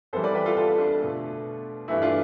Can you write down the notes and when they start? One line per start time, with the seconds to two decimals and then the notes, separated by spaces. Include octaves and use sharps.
0.13 F2 E3 G3 A4 C5
0.24 B4 D5
0.35 G4 B4
0.46 F4 A4
0.57 F4 A4
0.78 D4 F4
1.01 B2 A3
1.88 G2 E3 A3 E4
2.02 D4 F4